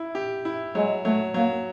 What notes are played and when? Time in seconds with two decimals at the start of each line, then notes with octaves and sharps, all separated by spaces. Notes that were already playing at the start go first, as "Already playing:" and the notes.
Already playing: E4
0.15 G4
0.45 E4
0.75 F#3 G#3
1.05 F#3 A3
1.34 F#3 A#3